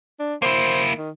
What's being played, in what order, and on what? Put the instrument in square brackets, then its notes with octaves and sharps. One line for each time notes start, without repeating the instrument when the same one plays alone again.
[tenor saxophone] D4
[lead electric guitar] A#3 E4 [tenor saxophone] C5
[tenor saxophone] D#3